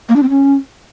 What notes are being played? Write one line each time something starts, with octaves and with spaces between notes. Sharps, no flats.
A#3
D4
C4
C#4